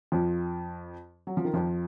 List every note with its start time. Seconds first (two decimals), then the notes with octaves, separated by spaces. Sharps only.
0.12 F2 F3
1.27 F#3
1.37 F3
1.45 D#3
1.54 F2 F3